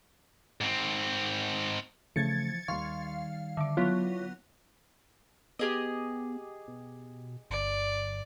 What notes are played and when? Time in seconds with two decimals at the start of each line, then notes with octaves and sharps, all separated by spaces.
0.61 G#2 C4
2.16 C#3 E3 F3 A3 G#6 A6 C#7
2.68 D#2 D#3 G3 F5 C6 C#6
3.57 D3 E5 D6
3.77 F#3 B3 E4 F4 C#5
5.59 B3 G4 G#4 D#5
6.68 B2
7.50 G1 D5